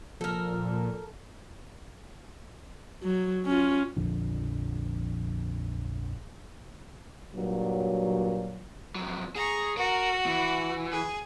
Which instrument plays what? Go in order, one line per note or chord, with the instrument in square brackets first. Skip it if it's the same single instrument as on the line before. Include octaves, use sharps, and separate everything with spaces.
[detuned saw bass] A#2 [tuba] F3 [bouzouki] A4 A#4
[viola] F#3
C#4 F4
[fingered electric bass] A#1 F2 D3 F3
[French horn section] G2 A#2 F#3
[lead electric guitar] F2 F#3
[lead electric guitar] G#4 [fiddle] A#5 C#6
[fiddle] F#4 [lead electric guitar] A#4
[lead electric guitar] E3
[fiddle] G#4